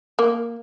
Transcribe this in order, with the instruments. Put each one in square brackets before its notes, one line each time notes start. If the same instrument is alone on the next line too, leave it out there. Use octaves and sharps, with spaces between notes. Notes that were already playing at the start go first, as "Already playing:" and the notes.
[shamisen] A#3